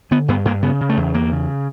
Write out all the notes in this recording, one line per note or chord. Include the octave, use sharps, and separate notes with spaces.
D3 B3
G2 B3
G2 A#3
C#3 B3
C#3
A3
E2
E2 A#3
C#3